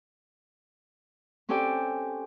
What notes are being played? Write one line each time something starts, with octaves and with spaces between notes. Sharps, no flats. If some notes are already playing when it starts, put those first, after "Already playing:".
C4 C#4 G4 A4 D5 G5